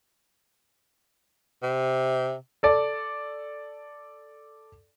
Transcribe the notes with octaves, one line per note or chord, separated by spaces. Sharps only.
C3
A4 D5 A5